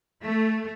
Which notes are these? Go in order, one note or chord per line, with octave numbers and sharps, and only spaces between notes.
A3